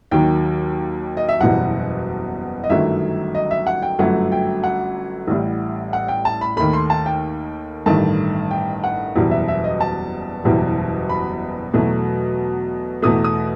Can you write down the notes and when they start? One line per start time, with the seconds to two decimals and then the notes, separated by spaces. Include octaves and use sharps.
0.11 D#2 D#3 F#3 G5
1.17 D#5
1.29 E5
1.40 F#1 E2 B2 G3 F#5
2.64 D#5
2.70 G1 F#2 D#3 F#3 A3 E5
3.35 D#5
3.51 E5
3.67 F#5
3.82 G5
3.99 G1 F#2 F#3 A3 F#5
4.32 G5
4.64 F#5
5.28 A1 A2 G3
5.93 F#5
6.08 G5
6.25 A5
6.41 B5
6.57 D#2 D#3 A3 B5
6.73 C6
6.90 A5
7.06 G5
7.86 A1 G2 D#3 A3 A5
8.51 G5
8.84 F#5
9.15 F#1 E2 B2 G3
9.31 E5
9.48 E5
9.64 D#5
9.81 A5
10.44 F#1 E2 B2 G3
11.09 B5
11.74 E2 B2 F#3 A3
13.02 E2 B2 A3 D#6
13.24 D#6